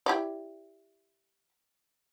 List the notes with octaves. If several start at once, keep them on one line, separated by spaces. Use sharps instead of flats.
E4 G4 D5